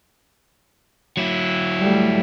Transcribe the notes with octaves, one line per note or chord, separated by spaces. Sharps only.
F#3 E4
G3 A3